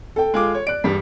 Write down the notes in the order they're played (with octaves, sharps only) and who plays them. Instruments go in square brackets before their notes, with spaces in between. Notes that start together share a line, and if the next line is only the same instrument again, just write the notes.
[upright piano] A4 G5
[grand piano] G#3 F4 D6
C#5
[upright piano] D5 F#6 [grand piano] D7
[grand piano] E1 G3 [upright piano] G2 B6